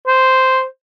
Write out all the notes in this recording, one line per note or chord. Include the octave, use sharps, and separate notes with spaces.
C5